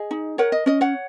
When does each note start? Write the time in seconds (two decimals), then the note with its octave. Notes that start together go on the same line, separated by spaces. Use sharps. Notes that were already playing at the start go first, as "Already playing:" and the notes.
Already playing: G#4 D#5
0.11 D#4
0.38 A#4 C#5 F#5
0.52 D#5
0.66 C#4 D#5
0.81 C#5 F#5